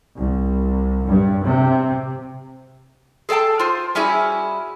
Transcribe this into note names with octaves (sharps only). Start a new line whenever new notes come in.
C2
G2
C3
G#4 A4 D5 G5 A5
F4 C5
G3 C#4 E4 F#4 G#4